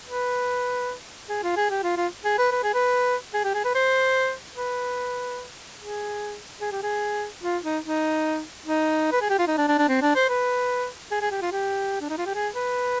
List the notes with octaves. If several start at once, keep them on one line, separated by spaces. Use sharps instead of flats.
B4
G#4
F4
G#4
G4
F4
F4
G#4
B4
B4
G#4
B4
G#4
G4
G#4
B4
C5
B4
G#4
G#4
G4
G#4
F4
D#4
D#4
D#4
B4
G#4
G4
F4
D#4
D4
D4
D4
C4
D4
C5
B4
G#4
G#4
G4
F4
G4
D4
D#4
F4
G4
G#4
B4